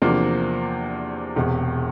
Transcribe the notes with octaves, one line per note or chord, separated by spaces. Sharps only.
E2 C3 F3 A#3 D4
E1 E2 C3